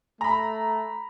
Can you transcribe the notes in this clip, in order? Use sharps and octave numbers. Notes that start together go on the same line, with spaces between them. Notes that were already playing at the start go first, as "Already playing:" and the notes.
A3 A#5 B5